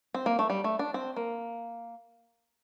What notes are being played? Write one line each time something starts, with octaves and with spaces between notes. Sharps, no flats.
C4
A#3
A3
G3
A3
D4
C4
A#3